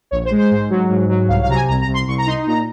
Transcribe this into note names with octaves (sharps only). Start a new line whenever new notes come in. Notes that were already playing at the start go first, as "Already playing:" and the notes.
A#1 C#5
C5
G#3
C5
G#2
F#3
G#2
F#3
C2 F5
F5
C3 A#5
G#5
C2 A#5
A#5
C2
C6
C2 C#6
A#5
D#4 C6
A#2 A#5